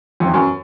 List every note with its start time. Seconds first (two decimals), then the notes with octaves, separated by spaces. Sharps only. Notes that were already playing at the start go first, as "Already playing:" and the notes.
0.20 F2
0.27 E2
0.34 F#2